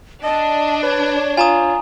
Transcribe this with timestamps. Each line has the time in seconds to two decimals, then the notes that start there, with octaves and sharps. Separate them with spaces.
0.24 D4 D#5 A5
0.82 B4 C#5
1.37 F4 G#5 A#5 D#6